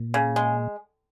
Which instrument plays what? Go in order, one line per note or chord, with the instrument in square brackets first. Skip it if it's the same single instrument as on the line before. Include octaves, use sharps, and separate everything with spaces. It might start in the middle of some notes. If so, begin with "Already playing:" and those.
Already playing: [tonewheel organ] A#2
[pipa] C#3
G#3